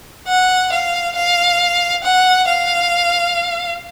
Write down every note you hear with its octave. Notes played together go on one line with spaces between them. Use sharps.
F#5
F5
F5
F#5
F5